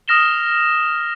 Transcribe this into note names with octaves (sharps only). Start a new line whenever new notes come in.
D#6 F6 A#6 E7 G7